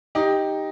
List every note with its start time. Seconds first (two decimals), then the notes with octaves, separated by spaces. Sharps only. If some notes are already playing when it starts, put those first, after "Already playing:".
0.15 D#4 G4